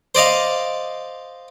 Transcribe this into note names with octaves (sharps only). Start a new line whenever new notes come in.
C5 D5 D#5 F5